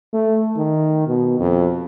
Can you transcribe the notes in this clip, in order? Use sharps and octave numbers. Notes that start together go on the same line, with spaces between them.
A3
D#3
B2
F2